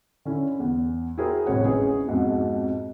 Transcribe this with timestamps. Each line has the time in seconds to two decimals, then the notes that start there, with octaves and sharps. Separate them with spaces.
0.25 D3 C#4 E4
0.60 E2
1.18 E4 F#4 G#4 A#4 C5 G5
1.46 D1 G#1 A2 C3 C#5 F#5
1.65 C#4 E4 G#4 B4 C#5
2.08 F2 G#2 B2